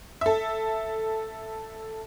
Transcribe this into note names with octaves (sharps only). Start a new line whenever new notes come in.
A4 E5